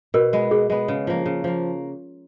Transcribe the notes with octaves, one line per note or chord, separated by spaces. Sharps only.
B2 A#4
G#3 B3
B2 G#4
G#3 B3
C#3
F3 A#3
C#3
F3 A#3